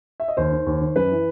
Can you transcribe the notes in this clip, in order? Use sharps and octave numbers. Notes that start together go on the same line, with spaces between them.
E5
D#5
D#2 C5
D#3
D#2
D#3
F#2 B4
E3